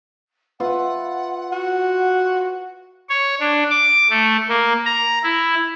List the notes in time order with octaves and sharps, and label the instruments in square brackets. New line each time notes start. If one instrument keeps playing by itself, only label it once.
[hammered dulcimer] F4 B4 E5 [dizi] F#5
[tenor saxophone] F#4
[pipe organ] C#5
D4
D6
A3
A#3
A#5
E4